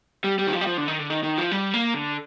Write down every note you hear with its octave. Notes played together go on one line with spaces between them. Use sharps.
G3
G3
D#3
F3
G3
F3
D3
D#3
D3
D#3
D#3
F3
G3
A#3
D3